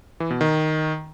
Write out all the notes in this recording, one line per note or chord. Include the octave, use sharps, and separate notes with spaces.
E3
B2
D#3